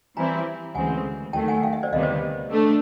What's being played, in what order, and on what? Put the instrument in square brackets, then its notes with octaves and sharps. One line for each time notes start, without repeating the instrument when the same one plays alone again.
[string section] E3 G3 C4 E4 [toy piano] G#5 A#5
[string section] D2 C#3 E3 G#3 C4 [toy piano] F#5 G#5
[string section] D#2 D#3 F#3 A3 [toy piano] G5 A5
[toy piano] F#5 G#5
F5 G5
E5 F#5
C5 D5
[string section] D2 C3 D#3 G3 B3 [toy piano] D#5 F5
[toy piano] C5 D5
[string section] A3 D4